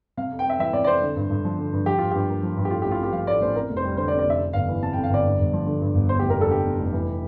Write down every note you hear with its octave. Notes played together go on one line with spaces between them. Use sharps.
C3 F5
F2
G5
F2 E5
E3 E5
C3 D5
D5
F2 C5
D3
G2
G2
F3
D3
G2
F3 G4
G2 F4
G2 G4
A#3
F3
G2
G4
A2 F4
G4
A1
F4
C4 G4
F3 F5
A2 D5
A1 C5
F2 A#4
F1
C5
G3
D3 C5
D5
F2
D5
F1 E5
F2
G1 F5
E3
C3 A5
G5
F2
F5
G1 D5
G2
G1
F3
D3
G2
G1
E2 C5
G4
F1
A#4
G3 A4
D3 G4
E2
F1
E3